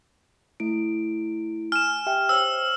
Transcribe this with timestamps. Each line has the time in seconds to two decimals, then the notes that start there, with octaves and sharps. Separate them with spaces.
0.60 A3 E4 D7
1.72 G#5 F6 E7
2.06 G4 E5 G5
2.29 C5 C#5 E6